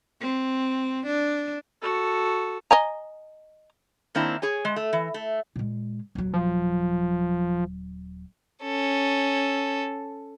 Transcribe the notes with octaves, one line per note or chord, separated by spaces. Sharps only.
C4
D4
F#4 A4
D#5 G#5 A#5
D#3 A#3 C4 D4 E4
G#4 C#5 G#5
G#3
A3
E3
A3
A#2 G#3
D#1 F#3
F3
C#4 A4